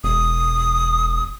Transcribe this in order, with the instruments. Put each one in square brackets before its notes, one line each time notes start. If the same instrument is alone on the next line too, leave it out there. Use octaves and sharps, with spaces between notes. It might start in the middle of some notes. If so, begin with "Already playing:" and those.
[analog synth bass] E1 [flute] D#6